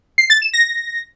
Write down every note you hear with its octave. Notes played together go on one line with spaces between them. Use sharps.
C7
A6
E7
A#6